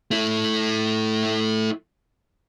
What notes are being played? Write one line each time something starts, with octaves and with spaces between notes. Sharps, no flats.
A3 E4